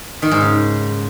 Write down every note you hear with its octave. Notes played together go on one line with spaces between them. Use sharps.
D#3
G#2
C#3